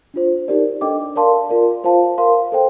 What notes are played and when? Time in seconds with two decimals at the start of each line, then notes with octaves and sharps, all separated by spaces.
0.14 D4 F4 C5
0.48 D#4 G4 A#4 D5
0.81 D4 A4 D#5 G5 D6
1.16 A#4 D5 F5 A5 C6
1.49 F4 A#4 D5
1.84 F4 C5 F5 A5
2.18 A#4 F5 C6
2.52 A4 C5 G5